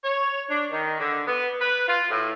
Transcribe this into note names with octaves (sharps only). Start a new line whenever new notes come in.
C#5
D4
D#3
D3
B3
B4
F4
A2